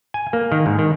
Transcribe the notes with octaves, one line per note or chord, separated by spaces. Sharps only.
G#5
A#3
D#3
G#2
D#3